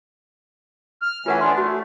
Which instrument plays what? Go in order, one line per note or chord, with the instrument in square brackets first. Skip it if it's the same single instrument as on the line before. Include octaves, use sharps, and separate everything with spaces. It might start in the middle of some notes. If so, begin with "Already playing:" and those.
[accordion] F6
[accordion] E3 A3 C#4 [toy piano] F4 A#4 F#5
[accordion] E3 B3 D4 [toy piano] C6
[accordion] A3 [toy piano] F#4